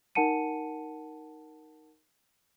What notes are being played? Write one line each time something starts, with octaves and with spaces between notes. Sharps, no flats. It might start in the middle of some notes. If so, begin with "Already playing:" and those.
D#4 A#4 F#5 A5 C#7 D#7